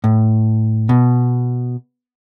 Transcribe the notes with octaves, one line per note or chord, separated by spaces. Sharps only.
A2
B2